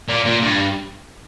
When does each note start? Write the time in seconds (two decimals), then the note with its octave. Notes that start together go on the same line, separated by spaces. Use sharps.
0.08 A#2
0.26 A#2
0.42 G2